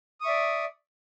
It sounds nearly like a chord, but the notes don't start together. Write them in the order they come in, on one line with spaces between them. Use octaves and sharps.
D#6 C#6 E5 D5